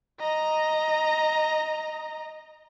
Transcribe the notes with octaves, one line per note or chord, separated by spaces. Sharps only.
D#5 A#5